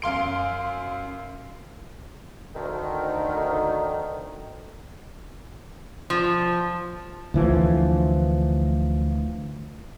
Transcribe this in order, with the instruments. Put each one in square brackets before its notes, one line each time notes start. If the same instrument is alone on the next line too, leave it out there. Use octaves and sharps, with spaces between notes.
[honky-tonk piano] F#2 F5 C6 D7
[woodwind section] D2 D#3
[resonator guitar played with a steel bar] F3
[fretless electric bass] D2 E3 F3